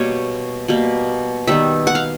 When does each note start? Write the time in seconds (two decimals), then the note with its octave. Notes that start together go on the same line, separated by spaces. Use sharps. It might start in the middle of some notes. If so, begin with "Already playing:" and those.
Already playing: B2 G3 A#3 C#5
0.68 B2 G3 A#3
1.47 D#3 G3 B3 E5
1.87 F#5
1.95 F5